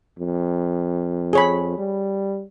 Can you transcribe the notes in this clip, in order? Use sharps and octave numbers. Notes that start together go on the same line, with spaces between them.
F2
G#4 C#5 B5
G3